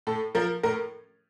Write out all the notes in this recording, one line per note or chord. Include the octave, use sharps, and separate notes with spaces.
A2 A4
F3 A#4
A2 A#4